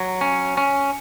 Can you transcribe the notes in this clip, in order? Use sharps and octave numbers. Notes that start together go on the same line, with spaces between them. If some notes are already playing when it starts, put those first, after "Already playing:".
Already playing: F#3
C#4
C#4